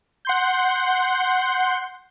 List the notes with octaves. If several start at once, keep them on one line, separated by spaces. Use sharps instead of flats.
F#5 C6 G6